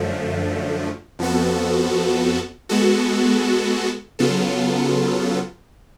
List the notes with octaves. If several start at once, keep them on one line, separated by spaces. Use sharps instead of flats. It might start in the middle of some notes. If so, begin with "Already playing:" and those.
Already playing: F#2 D3 F3 A3
F2 F3 B3 F#4 A4
G#3 B3 F#4 A4
C#3 F#3 B3 F4 A4